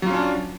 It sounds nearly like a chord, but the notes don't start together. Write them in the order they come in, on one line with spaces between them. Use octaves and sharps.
F#3 F4 C#4 D4